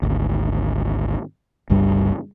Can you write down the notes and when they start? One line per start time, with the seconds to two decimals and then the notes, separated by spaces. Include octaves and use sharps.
0.02 G#1 D2
1.70 G1 C#2 G2 G3